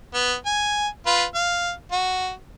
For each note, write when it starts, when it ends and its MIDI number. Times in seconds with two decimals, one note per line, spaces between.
0.14 0.34 59
0.46 0.88 80
1.06 1.24 65
1.06 1.24 71
1.35 1.72 77
1.92 2.31 66